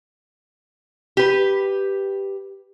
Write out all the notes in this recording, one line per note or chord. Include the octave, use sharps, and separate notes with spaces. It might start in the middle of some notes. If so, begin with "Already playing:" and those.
G4 B4